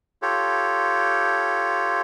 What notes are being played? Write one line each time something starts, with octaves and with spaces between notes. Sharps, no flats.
F4 G4 A4 C#5